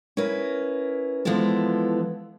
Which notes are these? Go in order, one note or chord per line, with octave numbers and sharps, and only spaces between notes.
C#4 E4 A#4 B4
E3 F3 G#3 B3 E4 A4